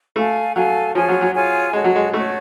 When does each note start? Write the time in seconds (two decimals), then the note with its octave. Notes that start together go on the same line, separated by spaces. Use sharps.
0.16 A3 A4 F5 G#5
0.56 F#3 A4 F5 G#5
0.95 F3 F4 G#4 C#5 G#5
1.09 F#3
1.21 F#3
1.34 F4 G#4 C#5 G#5
1.73 G#3 F#4 A4 C#5
1.84 F#3
1.96 G#3
2.13 A3 F#4 A4 C#5